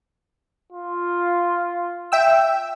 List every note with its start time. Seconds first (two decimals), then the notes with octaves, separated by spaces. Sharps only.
0.72 F4
2.12 E5 G5 E6